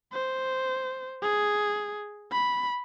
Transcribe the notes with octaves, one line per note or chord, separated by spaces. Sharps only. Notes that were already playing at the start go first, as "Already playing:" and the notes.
C5
G#4
B5